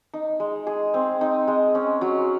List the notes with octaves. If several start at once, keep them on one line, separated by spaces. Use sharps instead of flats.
D#4
G#3
G#4
C4
D#4
G#3
C#4
F#3